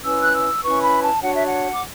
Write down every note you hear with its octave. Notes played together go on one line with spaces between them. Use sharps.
C#4 E4 B4 E6
F#6
E6
C#4 E4 B4 C#6
B5
A5
D4 F#4 C#5 F#5
E5
F#5
D6